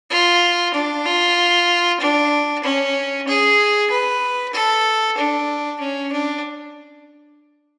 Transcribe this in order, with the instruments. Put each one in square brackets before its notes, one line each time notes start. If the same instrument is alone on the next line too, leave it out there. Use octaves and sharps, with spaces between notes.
[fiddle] F4
D4
F4
D4
C#4
G#4
B4
A4
D4
C#4
D4